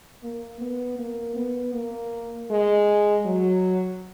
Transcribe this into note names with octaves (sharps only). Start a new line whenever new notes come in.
A#3
B3
A#3
B3
A#3
G#3
F#3